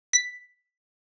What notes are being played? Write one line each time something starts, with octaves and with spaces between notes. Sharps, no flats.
B6